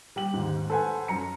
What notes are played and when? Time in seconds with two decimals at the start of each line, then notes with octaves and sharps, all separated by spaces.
0.16 G3 G5 F#7
0.34 D#2 G#2
0.70 A4 B4 C5 F#5 G#5
1.08 F#2 A#5 C#7